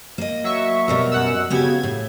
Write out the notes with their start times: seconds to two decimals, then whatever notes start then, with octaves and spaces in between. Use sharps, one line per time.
0.18 A#3 D#5
0.44 F#3 E5 C#6
0.88 B2 G3 A#4
1.11 F#2 F#5 E6
1.50 C#3 B3 F#4 G4 G#6
1.83 A2